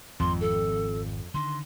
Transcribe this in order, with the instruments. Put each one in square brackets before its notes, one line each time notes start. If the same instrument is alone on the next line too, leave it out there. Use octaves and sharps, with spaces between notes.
[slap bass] G#1 [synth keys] F2 [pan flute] C6
[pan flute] A4
[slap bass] D3 D#3 [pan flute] C6